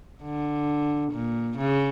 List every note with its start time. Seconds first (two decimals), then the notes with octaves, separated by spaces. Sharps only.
0.23 D3
1.12 A#2
1.58 C#3